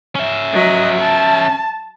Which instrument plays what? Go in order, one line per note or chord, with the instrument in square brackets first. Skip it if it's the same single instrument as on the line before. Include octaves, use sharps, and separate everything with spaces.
[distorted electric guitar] C#4 E5
[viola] F#3 D#5
A5